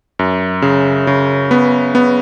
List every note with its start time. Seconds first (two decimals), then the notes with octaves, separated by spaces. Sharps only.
0.19 F#2
0.62 C#3
1.07 C#3
1.51 B3
1.95 B3